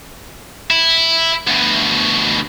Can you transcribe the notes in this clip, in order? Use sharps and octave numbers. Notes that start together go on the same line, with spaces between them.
E4
D2 B2